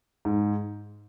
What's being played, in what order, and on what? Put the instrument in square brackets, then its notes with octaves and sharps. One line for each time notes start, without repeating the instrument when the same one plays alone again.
[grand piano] G#2